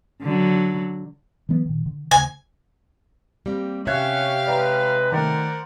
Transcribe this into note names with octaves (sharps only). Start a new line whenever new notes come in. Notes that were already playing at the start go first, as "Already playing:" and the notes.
D3 F#3
E3 F#3 B3
A#2 D#3
D3
D2 C#3 G#5
G3 A#3 C4
C3 C#4 G4 C#5 E5 F5 F#6 G#6
G#3 B4 D5 G5 A#5
D#3 A3 A#4 C5 D5 F#5